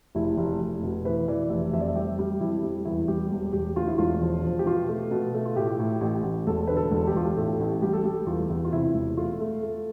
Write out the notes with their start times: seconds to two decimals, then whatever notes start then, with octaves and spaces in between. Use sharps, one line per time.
0.15 F1 E4
0.37 F1
0.60 F1
0.83 B2
1.05 E3 B4
1.28 E3 D5
1.50 F1 E5
1.73 F2 E5
1.81 D5
1.88 E5
1.96 G3 G4
2.19 G3
2.40 F2 E4
2.63 G3
2.85 E2 E4
3.08 G3 G4
3.31 E1
3.53 E1 G4
3.76 D2 F4
3.87 E4
3.98 E1 F4
4.21 F3
4.44 F3
4.59 G4
4.66 B2 F4
4.88 A3
5.11 B2
5.34 A3
5.45 F4
5.56 A2 G4
5.79 A2
6.01 A1
6.23 A1
6.47 E1 A4
6.67 D3 B4
6.77 A4
6.91 E1
7.07 G4
7.14 E1 F4
7.25 G4
7.36 A2 A4
7.60 A1
7.82 G3 G4
7.93 A4
8.04 G3 G4
8.26 E2 F4
8.50 E2
8.65 F4
8.72 C3 E4
8.94 E1
9.17 A3 F4
9.40 A3
9.63 A3